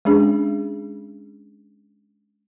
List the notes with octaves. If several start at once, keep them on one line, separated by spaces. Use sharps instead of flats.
G#3 C#4 D4 G#4